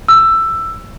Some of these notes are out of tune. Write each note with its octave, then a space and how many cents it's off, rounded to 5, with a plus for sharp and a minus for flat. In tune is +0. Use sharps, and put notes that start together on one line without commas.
E6 +10